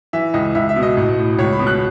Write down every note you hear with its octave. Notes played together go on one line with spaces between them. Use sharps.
E3 E5
C#2 D#5
C#2 E5
E5
B2
D#5
A1
A2
C#2 C#5
B5
B2
F#6